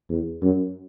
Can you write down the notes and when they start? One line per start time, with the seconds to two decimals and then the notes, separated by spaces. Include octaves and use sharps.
0.10 E2
0.42 F#2